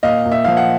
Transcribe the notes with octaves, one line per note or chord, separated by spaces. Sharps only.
A#2 D#5 F5
A#2
E5
F3 F5
F#5